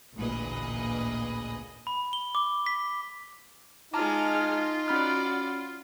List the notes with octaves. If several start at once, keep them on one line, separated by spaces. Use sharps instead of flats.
A1 D2 A#2 G#4 B4 D#5
B5
G7
D6
B6
G#3 D#4 F4 A5 A#5 D6 F6
C#4 F#4 D5 B5 F6